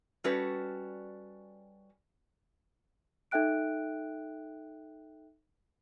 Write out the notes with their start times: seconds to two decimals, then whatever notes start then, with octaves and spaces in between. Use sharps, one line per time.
0.24 G3 C#4 F#4 A4 B4
3.31 D#4 A4 E5 G5 F#6 D7